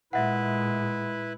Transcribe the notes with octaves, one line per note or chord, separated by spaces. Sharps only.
A#2 G#3 E4 B4 E5 F#5